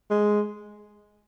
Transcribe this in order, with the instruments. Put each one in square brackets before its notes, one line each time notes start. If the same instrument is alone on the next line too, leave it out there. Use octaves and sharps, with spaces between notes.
[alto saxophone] G#3